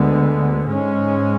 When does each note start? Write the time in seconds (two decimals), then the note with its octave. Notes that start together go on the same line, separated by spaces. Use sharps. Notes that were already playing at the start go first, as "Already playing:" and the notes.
Already playing: D2 D3 G#3 B3
0.65 G#2 G#3 C#4